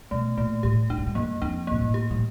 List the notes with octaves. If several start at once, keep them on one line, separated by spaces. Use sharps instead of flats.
B2 A3
A#2 A3
A2 G4
G#2 D4
A2
G#2
F#2 A#3
F2 D4
A#2 A#3
A2
G4
A2